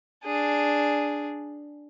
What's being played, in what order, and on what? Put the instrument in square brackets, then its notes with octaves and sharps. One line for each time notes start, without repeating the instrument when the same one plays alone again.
[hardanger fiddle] D4 G#4